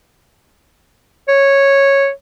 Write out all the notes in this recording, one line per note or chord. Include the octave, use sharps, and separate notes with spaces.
C#5